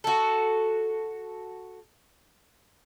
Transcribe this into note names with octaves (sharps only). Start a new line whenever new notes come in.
F#4 A4